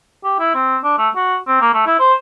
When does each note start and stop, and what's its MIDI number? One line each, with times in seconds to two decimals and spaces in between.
0.24 0.38 67
0.39 0.54 64
0.55 0.77 60
0.84 0.97 62
0.98 1.09 57
1.16 1.37 66
1.47 1.57 60
1.61 1.71 58
1.74 1.85 57
1.86 1.97 64
1.99 2.13 72